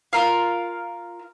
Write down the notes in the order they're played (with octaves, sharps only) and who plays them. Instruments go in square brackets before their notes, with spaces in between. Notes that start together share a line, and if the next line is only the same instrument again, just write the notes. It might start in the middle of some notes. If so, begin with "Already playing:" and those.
[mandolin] F4 A#4 F5